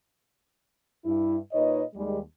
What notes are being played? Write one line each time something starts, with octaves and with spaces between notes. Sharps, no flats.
G2 E4
A#2 D#4 B4 C#5 D#5
D#2 G3 G#3